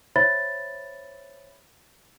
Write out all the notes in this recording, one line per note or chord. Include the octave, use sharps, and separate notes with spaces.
C5 C#5 E5 B5 A6